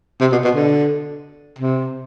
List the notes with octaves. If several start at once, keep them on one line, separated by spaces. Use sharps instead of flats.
C3
B2
B2
D3
C3